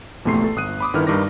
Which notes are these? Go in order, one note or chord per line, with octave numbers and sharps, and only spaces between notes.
A#1 E2 C3 A3 C6 C7
A4
G1 D#6 F#6 D#7
B5 D6 D#6
G1 D3 D#3 E4 B4 F6
G2 D#4 A#4 B4 D6 A#6